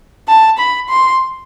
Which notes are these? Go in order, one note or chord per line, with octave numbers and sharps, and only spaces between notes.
A5
B5
C6